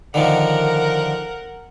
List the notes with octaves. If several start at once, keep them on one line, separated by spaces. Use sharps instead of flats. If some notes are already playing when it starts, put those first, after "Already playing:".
D3 D#3 F3 A#4 F#5